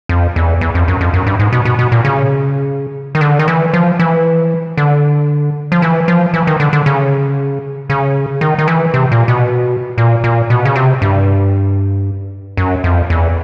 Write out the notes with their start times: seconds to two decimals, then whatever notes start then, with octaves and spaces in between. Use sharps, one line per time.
0.09 F2
0.36 E2
0.61 E2
0.75 F2
0.88 F#2
1.01 F2
1.14 F#2
1.26 G2
1.39 G#2
1.53 B2
1.65 B2
1.79 B2
1.92 A#2
2.05 C#3
3.15 D#3
3.21 D3
3.39 D#3
3.48 E3
3.74 F3
3.99 E3
4.77 D3
5.72 F3
5.82 E3
6.08 F3
6.34 E3
6.47 D#3
6.60 D3
6.73 D3
6.86 C#3
7.90 C#3
8.41 D#3
8.58 D#3
8.68 E3
8.94 C3
9.12 A#2
9.28 B2
9.98 A#2
10.24 A#2
10.50 B2
10.65 C#3
10.75 C3
11.02 G2
12.57 F#2
12.84 F2
13.10 E2